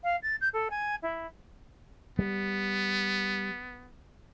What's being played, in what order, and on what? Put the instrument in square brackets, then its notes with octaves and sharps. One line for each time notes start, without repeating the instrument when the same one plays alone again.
[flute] F5
A6
G6
A4
G#5
E4
[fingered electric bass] G3 [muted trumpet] B3